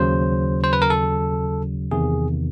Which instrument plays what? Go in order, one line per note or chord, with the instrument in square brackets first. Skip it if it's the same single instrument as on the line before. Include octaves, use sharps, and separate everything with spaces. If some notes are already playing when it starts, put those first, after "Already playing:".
Already playing: [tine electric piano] D#2 C#3 F#3 C5
C5
B4
A#4
A4
E2 C3 D#3 G#4